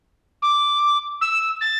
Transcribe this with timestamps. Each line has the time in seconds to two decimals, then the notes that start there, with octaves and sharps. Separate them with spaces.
0.42 D6
1.21 E6
1.61 A6